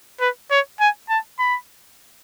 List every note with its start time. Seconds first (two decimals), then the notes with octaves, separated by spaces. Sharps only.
0.20 B4
0.51 C#5
0.80 G#5
1.09 A5
1.39 B5